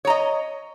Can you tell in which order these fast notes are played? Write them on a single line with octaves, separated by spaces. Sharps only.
C#5 A#5 D#5